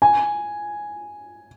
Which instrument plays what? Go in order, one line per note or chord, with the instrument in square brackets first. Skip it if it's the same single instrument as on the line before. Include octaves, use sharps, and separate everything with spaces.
[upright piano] G#5